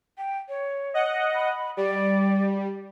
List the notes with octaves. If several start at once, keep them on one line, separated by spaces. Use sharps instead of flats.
G5
C#5
D#5 F#5
B5
G3 D5